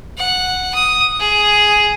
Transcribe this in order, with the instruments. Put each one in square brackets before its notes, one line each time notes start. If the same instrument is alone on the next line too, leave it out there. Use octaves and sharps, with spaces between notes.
[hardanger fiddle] F#5
D#6
G#4